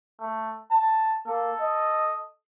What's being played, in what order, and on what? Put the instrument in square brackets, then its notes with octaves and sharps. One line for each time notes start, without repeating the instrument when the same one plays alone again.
[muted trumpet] A3
A5
[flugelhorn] A#3 [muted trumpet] A4
[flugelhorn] D#5